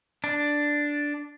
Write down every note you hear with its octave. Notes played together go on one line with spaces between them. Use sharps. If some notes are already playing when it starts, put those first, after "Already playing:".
D4